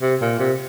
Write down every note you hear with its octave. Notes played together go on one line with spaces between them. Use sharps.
C3
A#2
C3